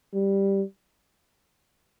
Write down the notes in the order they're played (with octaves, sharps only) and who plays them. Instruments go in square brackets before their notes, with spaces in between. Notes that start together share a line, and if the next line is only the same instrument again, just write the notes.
[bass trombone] G3